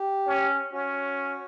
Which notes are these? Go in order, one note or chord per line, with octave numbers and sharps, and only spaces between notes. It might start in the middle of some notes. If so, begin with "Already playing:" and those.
Already playing: G4
C#4
C#4 F#4